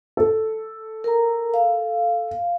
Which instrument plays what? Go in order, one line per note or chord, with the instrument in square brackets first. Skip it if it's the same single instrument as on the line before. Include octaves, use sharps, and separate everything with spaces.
[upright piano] A4
[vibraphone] A#4 A#5
F5